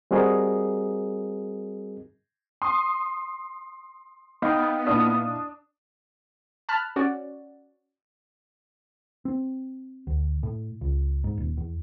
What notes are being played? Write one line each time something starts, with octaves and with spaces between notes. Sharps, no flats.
G3 C4 F#4 G#4 A#4 D#5
C6 D#6
B3 D#4 F5 G5
A#2 D4 E4 F5 D#6
A5 B5 F6 F#6
C#4 F#4 D5
C4
D2
A2
C#2
G#2
D#1
E2